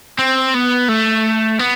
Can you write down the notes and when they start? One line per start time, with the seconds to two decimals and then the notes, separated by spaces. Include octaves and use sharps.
0.19 C4
0.54 B3
0.89 A3
1.59 B3